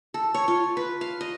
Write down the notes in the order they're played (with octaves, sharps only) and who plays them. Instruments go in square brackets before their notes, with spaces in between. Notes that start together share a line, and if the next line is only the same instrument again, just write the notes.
[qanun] A4
C#5
F4
B4
F5
D#5